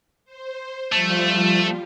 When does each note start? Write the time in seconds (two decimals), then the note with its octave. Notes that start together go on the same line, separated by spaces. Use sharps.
0.25 C5
0.92 F3 G3 A3 F4